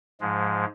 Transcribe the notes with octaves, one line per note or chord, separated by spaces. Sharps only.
G#2 F3 G#3